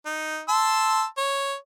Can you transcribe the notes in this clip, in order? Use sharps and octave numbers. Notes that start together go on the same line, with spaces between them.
D#4
A5 C6 E6
C#5